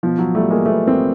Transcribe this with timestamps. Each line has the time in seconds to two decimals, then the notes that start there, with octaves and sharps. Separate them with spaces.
0.03 B2 F3
0.19 F#3
0.35 G3 A3
0.50 G#3 A#3
0.66 A3 B3
0.87 A#3 C4